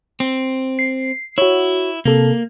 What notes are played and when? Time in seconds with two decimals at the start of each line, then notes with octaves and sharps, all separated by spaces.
0.20 C4
0.79 C7
1.38 E4 F#4 C#5
2.05 C3 A#3 A4